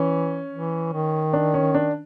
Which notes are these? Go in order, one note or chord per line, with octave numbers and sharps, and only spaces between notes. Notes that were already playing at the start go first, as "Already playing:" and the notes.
Already playing: E3 C#4
E3
D#3
D4
C#4
D4